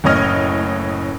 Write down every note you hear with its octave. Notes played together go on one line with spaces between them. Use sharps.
F#1 A2 C#4 C#5 D#5 F6